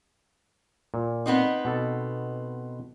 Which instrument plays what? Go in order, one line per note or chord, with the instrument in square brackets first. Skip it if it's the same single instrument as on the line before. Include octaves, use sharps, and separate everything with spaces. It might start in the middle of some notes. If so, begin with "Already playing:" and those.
[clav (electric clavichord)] A#2
[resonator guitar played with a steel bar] B3 C4 D#4
[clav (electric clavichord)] B2 A4